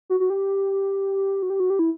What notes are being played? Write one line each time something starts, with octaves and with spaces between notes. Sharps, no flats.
F#4
F#4
G4
F#4
G4
F#4
G4
E4